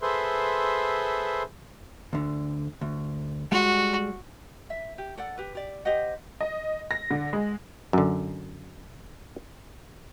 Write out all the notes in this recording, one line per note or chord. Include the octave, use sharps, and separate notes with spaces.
G#4 A4 B4 C5 E5 C6
D2 D3
D2
G3 G#3 F#4 F#5
E5
G4
A4 D5 F#5
G4 B4
G4 D5
G4 C5 D#5 F#5
D#5
A#6
D3
G#3
F#2 D3